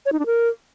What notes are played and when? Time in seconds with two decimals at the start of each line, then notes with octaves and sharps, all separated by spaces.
0.06 C#5
0.13 D#4
0.19 D4
0.26 A#4